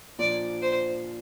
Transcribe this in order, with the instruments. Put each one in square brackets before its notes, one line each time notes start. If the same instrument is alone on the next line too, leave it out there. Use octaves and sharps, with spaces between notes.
[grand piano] A#2 F3 D4 F4 [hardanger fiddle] D5
[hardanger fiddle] C5